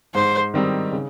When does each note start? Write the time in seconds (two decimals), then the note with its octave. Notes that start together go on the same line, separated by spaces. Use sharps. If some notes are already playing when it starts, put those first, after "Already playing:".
0.15 G#2 C5
0.54 D#3 G3 C4 D#4
0.92 C#3